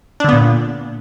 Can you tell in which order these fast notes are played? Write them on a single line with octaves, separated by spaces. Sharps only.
D4 D3 B3 A#2